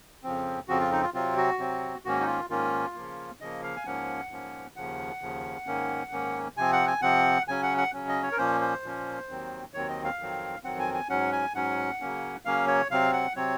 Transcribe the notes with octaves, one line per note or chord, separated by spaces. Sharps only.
F2 C#3 F3 C4
F2 C#3 F3 C4 F#4
F4
D#4
F4
C3 F#3 C4 F4
F#4
C3 F#3 C4
G#2 D#3 A#3 C#4 F#4
D#4
F4
G#2 D#3 A#3 C#4 F4
C#3 F3 A#3
C#3 F3 A#3 D#5
F5
G#5
G#2 F3 A#3 C#4 F#5
G#2 F3 A#3 C#4
D#2 C#3 F3 F#5
D#2 C#3 F3
G#2 D#3 A#3 C#4
G#2 D#3 A#3 C#4
C3 F3 C4 G#5
F#5
G#5
C3 F3 C4 F#5
C#3 F#3 C#4 G#5
F#5
F#5
C#3 F#3 C#4
D#5
C#5
A#4
A#2 F3 A#3 C#4 C5
C5
A#2 F3 A#3 C#4
D#2 D#3 F#3 C4
D#2 D#3 F#3 C4 C#5
D#5
F5
F2 D#3 F#3 C4
F2 D#3 F#3 C4 F#5
G#5
G#5
G#2 F#3 C#4 F#5
G#5
G#2 F#3 C#4 F#5
C#3 F#3 A#3 C#4
C#3 F#3 A#3 C#4 F5
C#5
C3 F#3 C4 F5
F#5
C3 F#3 C4 C#5